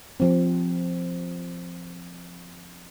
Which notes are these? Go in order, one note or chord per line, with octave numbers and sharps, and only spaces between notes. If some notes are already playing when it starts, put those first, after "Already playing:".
F3 C4